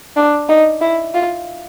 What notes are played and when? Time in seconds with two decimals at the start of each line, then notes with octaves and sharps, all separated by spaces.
0.17 D4
0.49 D#4
0.81 E4
1.14 F4